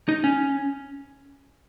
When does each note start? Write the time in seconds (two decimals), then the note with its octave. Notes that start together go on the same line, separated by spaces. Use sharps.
0.09 D#4
0.24 C#4